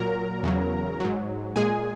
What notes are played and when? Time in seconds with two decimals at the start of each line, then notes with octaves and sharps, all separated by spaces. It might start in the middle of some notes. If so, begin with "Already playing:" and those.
Already playing: A#2 F#3 A#4 A#5
0.43 E2 C#3 F#3
1.00 G#2 F#3
1.56 A#2 G#3 G#4 G#5